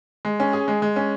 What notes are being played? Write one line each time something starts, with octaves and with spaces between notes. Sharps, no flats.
G#3
C#4
G#4
G#3
G#3
C#4